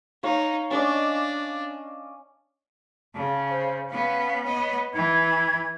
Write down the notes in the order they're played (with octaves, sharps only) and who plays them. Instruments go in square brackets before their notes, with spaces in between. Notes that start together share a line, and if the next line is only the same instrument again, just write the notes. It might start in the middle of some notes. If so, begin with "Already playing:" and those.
[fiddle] D#4 [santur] C#5 F5
[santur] C#4 D5 D#5 [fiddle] D4
[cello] C#3 [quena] A5
[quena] C5
[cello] B3 C#4 [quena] F5
[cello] B3 D#5 [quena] C#5
[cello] E3 [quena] G#6